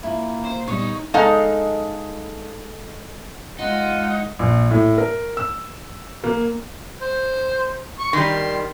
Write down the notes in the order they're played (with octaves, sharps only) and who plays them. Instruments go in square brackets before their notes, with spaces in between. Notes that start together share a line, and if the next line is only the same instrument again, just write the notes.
[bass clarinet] A#3 [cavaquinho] E4 [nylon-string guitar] F4 G#5
[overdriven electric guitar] C5
[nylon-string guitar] A#2 G3 B3 [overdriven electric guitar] D#4 [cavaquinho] C#5
[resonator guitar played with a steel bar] G#3 D#4 A4 F5 A#5
[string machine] G#3 [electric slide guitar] D#4 [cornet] F4 [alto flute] F#5
[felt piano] A#1
A2
A#4
E6
A#3
[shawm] C5
C#6
[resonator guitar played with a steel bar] D#3 G3 [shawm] C6